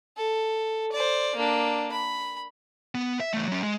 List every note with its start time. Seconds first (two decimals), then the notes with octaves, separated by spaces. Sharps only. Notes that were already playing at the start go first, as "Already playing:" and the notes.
0.17 A4
0.92 C5 D5
1.36 A#3 D4
1.92 B5
2.95 B3
3.20 E5
3.34 E2 A3
3.48 F#3 C#4
3.63 G#3